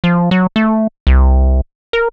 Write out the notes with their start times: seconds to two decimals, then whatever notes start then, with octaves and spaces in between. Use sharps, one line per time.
0.04 F3
0.31 F#3
0.56 A3
1.07 C2
1.93 A#4